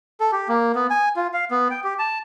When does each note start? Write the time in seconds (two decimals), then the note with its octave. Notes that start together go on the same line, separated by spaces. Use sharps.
0.20 A4
0.32 G4
0.49 A#3
0.75 B3
0.90 G#5
1.16 F4
1.33 F5
1.51 B3
1.71 G5
1.84 G4
1.99 A5